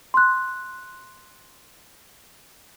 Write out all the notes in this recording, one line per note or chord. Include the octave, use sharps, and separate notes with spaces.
C6 F#6